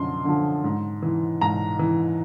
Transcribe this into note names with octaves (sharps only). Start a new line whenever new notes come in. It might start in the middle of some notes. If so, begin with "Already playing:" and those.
Already playing: F#2 D3 F3 C6
D3 F3
G#2
E3
G#2 A#5
E3